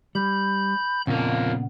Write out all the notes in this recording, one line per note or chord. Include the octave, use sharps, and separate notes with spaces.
G3 B5 G6
F2 A#2 C#3 A#3 B3